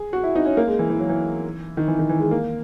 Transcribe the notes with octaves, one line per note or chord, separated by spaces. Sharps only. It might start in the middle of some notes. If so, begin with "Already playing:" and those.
Already playing: G#4
F#4
E4
D#4
C#4
A#3
G#3
E3
E3
F#3
E3
D#3
E3
D#3
E3
G#3
A#3